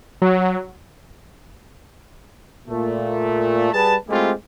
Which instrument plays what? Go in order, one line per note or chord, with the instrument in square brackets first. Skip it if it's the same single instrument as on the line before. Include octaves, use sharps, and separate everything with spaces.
[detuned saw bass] F#3
[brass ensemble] A#2 A3
G3 G#4 B4 A5
G#3 A3 C4 E4 F4 G4